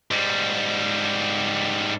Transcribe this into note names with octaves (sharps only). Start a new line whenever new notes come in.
G#2 G3